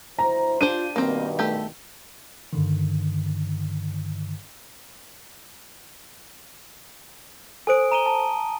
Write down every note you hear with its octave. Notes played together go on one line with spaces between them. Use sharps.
D2 E4 C5 A#5
D4 F4 G4 C5 D#7
G2 B2 D#3 A#3 C4
A3 G4
G2 D3 D#3
A4 C5 G#5 D#6 D7
A#5 D#7 G7
A5